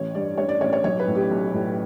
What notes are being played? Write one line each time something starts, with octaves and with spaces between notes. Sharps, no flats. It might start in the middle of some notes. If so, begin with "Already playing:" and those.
Already playing: A1 E3 C#5
G2 D5
G2 C#5
D5
A1 C#5
C#5
B1 C#5
B4
A2
G4
B1
A2